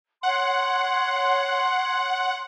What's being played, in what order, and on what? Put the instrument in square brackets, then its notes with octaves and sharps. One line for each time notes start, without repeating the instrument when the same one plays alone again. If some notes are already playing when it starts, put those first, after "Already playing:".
[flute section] C#5 C6 [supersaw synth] F#5